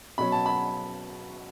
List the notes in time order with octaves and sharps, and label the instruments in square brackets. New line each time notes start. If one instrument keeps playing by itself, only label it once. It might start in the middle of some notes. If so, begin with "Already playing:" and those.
[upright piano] B2 F#3 C#4 B5
A5
B5